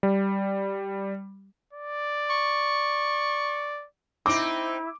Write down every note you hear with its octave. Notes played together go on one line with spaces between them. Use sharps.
G3
D5
C#6
C4 D#4 E4 D6